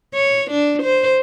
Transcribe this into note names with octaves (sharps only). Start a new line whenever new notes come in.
C#5
D4
C5